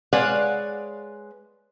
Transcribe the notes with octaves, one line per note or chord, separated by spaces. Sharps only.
G#3 B4 C#5 D5 F5 F#5